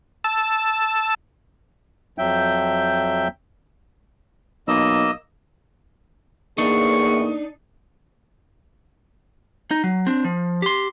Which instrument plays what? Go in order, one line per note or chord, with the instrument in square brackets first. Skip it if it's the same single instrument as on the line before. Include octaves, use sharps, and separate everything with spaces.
[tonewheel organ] A5 E6
[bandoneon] F2 F#3 E5 G5 G6
[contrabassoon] B1 [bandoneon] A#3 D#5 E6
[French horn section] E2 A2 G#4 [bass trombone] A#3 [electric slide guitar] D4 D#4 [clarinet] C#6
[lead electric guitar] D#4
F#3
C4 D4
F3
G4 C6